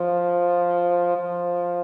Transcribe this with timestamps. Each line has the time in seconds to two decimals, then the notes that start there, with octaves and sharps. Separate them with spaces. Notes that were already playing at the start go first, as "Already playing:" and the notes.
Already playing: F3
1.17 F3